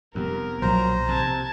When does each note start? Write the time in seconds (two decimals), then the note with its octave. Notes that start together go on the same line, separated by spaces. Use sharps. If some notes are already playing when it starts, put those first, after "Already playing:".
0.15 F1 F2 G3 B3 A#4
0.62 B1 A#2 F3 F#3 C5 A#5
1.09 C3 A5 G#6